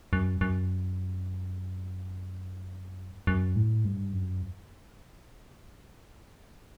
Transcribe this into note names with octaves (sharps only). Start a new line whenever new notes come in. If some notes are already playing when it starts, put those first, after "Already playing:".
F#2
F#2
F#2
A2
G2
F#2